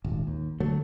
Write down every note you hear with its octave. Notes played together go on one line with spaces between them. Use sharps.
D#1 G#1
D#2
D3 F#3 A3